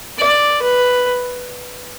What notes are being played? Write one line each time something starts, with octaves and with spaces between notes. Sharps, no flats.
D5
B4